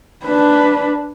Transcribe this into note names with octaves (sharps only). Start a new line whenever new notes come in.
D4 B4